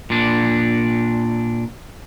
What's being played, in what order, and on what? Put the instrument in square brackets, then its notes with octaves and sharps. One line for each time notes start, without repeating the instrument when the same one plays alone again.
[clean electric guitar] A#2 D4